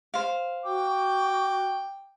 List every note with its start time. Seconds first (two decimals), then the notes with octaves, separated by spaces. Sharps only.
0.14 C5 F5
0.65 F#4 G5 D6